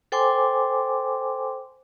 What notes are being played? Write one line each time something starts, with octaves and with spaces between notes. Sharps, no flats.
A4 C5 G5 G#5 C6 D6